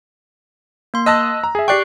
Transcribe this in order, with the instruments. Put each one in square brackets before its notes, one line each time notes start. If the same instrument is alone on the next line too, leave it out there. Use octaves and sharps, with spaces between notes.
[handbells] A#3 C6
[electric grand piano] D#5 A5 A#6 [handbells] E6 F#6
[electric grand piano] A#5
G#4 E5
[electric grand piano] G4 D5 G5 [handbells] C#6 F#6 C7